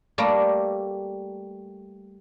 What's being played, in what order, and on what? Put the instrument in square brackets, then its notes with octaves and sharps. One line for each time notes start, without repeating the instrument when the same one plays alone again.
[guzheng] G3 A3 A#3